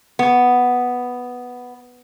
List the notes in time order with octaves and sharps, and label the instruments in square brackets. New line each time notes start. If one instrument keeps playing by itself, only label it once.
[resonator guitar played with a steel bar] B3